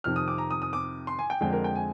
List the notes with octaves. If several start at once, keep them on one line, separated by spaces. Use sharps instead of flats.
F2 C3 D#3 F6
D#6
D6
A#5
D#6
D#6
D6
C6
G#5
G5
F2 D3 G#3 G5
A#4
G5
G#5